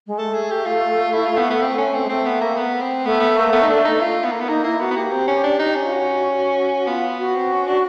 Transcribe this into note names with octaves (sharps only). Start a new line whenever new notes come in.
G#3
A3 A4
G#4
G4
F4
E4
F4
B3
B3
C4
C#4
C4
G#3
A3 C4
B3
A#3
B3
C4
A3 B3
B3
A#3
B3
D#4
D4
D#4
F4
B3
A#3
B3
A#3 D#4
A#3 E4
B3 F#4
B3
A#3 G4
C4
C#4
D4
D#4
C#4
F4
F#4
B3 F4
F#4
C4
C#4
D4